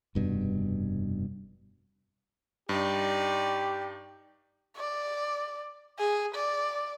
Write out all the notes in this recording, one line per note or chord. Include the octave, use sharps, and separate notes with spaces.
F1 G2 B2
G2 D#4 G4 D5
D5
G#4
D5